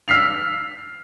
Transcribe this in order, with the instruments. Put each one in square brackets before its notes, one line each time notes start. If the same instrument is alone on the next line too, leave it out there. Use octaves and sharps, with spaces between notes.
[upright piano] E6 F6 B6 C7 F7